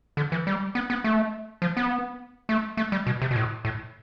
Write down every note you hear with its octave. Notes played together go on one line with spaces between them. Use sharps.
D3
E3
G3
B3
B3
A3
F3
B3
A3
A3
G3
B2
C3
B2
A2
A2